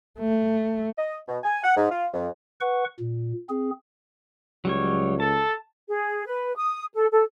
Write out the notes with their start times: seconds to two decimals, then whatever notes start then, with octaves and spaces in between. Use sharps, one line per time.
0.19 A3
0.98 D#5
1.28 B2
1.44 G#5
1.64 F#5
1.77 G#2
1.91 F4
2.14 F2
2.61 B4 F#5 C#6
3.00 A#2
3.49 C4 G#4
4.65 C#2 F#3 G3 C#5
5.20 A4 A5
5.89 G#4
6.26 B4
6.56 D#6
6.94 A4
7.11 A4